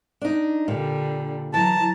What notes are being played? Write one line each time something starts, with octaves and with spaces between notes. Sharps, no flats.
D4 D#4
A#2 D3 G3
E3 F#3 A5 A#5